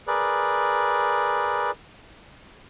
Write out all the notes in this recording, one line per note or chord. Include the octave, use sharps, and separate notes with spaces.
G#4 A#4 B4 D5